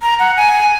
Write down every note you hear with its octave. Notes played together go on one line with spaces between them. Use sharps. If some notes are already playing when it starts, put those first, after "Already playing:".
A#5
F#5
G#5